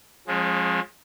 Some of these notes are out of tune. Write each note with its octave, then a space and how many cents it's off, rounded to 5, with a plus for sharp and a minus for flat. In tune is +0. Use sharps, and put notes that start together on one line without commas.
F3 +25 G#3 +0 C#4 -40